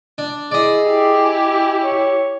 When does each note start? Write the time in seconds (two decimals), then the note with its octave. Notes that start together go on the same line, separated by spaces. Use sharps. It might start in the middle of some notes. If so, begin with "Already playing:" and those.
0.18 D4
0.51 E4 G#4 D5 D#5
0.83 E4 G4
1.24 G#5
1.81 C#5